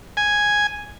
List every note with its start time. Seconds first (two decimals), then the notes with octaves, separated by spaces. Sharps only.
0.17 G#5